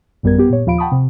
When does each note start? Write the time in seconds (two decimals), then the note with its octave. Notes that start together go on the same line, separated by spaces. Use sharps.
0.23 A1 F#2 G3 B3 A#4 G#6
0.38 B3 G4
0.50 A#2 C#5
0.66 D#2 F3 F4 F5 B5 D7
0.78 F#5 G5 A5 B5 C#6 D#6
0.92 C3